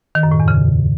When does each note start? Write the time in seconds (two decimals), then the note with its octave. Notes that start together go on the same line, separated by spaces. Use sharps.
0.15 D#3
0.23 F#2
0.31 A2
0.40 E2
0.48 C#3